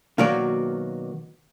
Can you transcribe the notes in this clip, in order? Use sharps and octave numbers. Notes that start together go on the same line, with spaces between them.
B2 D#3 F#3 A#3 F#4 D5